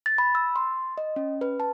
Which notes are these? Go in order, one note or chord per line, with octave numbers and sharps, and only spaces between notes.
A6
B5
E6
C6
D#5
C#4
B4
A5